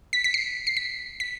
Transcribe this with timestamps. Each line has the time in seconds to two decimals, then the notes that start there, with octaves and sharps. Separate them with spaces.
0.13 B6
0.24 B6
0.34 C7
0.67 C7
0.77 B6
1.20 B6